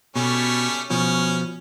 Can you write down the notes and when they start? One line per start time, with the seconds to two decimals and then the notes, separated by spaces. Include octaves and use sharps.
0.16 B2 G3 A3 C#4
0.90 B2 F3 C#4